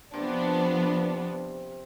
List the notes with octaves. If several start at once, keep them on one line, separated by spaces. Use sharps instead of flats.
C3 F3 B3 D4